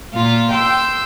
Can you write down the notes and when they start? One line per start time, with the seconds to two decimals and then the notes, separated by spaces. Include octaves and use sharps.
0.13 A#2 F4
0.51 G5 C6 E6